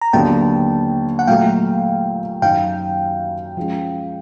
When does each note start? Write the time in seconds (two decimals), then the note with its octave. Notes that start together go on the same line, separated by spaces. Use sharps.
0.01 A#5
0.13 D#2 D3 F#3 B3 G5 A5
1.19 F#5
1.27 A#2 F#3 A3 F5 G5
2.42 F#2 D#3 F#3 F5 G5
3.57 F3 G#3 C#4